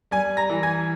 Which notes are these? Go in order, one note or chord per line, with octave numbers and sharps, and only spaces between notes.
G3 G#5 G#6
A#5 A#6
E3
G#5 G#6